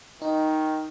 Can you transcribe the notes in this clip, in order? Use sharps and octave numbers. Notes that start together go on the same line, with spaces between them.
D#3 D#4